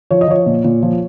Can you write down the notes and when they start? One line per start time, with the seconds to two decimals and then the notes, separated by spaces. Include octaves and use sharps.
0.11 F3 C#5
0.21 D#5
0.28 F3 C#5
0.46 A#2
0.65 A#2
0.83 F3